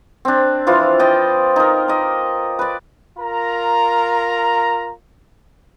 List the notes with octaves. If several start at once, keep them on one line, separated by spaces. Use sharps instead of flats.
C4 D4
E3 F3 F4
C5 D5 D#5 G5
D#4 A#4
D5 D#5
B4 D5
F4 A#4 A#5